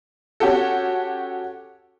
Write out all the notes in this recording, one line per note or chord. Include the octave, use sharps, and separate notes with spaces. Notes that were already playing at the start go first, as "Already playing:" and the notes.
C#4 F#4 G4 A4